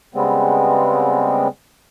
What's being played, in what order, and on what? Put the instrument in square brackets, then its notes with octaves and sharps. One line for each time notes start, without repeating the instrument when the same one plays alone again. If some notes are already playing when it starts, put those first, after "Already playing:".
[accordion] C#3 G3 G#3 B3 C4